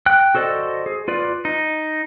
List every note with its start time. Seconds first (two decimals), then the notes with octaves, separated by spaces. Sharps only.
0.06 G5 F#6
0.35 F#4 A4 C5 D5 D#5
0.86 G#4
1.08 F4 B4 D5
1.45 D#4